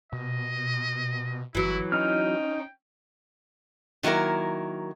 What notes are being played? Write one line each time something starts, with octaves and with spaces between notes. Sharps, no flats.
B2 D#5
G1 E3 F#3 E4
C#4 D#4 G5 F6
D#3 F#3 A#3 E4 A#4